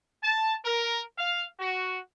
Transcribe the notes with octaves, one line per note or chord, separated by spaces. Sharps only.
A5
A#4
F5
F#4